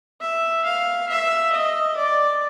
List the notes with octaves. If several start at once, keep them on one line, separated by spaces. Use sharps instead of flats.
E5
F5
E5
D#5
D5